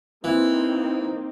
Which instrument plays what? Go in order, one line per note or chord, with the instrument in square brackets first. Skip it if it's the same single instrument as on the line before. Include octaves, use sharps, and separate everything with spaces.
[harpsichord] E3 [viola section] A#3 C4 D#4